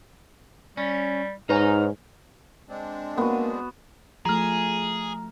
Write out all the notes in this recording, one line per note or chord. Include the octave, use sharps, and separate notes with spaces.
G3 C#4
G#2 D#4 B4 C#5 G#5 A#5 F6
G#3 C4 D4
A#3 B3 F#4
F3 A3 G#4 A#5 F6